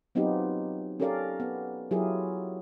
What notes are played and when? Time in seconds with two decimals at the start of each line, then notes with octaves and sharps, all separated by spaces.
0.15 F#3 B3 C4 D#4 F4 G4
1.00 C#4 G4 A4 A#4 D5 F5
1.40 B3
1.91 F#3 E4 F4 G4 G#4 A#4